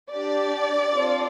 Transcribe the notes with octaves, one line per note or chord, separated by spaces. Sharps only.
D4 G4 D5
C4 F4 A4